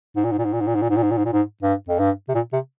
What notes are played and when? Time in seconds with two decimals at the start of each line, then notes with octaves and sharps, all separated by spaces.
0.16 G#2
0.24 A#2
0.31 G#2
0.39 A#2
0.45 G#2
0.53 A#2
0.60 G#2
0.67 A#2
0.75 G#2
0.82 A#2
0.89 G#2
0.97 A#2
1.03 G#2
1.11 A#2
1.17 G#2
1.25 A#2
1.32 G#2
1.62 G2
1.88 F2
1.99 G2
2.28 C3
2.34 A#2
2.53 C3